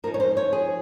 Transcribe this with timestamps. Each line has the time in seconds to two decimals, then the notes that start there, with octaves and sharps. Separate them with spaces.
0.04 F3 G#3 D#4 A#4
0.14 C#5
0.20 C5
0.37 C#5
0.53 G#4